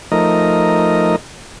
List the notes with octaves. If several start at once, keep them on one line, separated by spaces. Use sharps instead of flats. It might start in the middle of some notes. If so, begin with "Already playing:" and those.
F3 A3 D#4 A#4 D#5